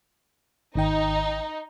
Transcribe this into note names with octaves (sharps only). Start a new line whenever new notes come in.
G#1 D#3 D#4 G5